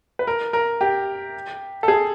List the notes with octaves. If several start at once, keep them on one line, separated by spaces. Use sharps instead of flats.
B4
A#4
A#4
G4
A4
G#4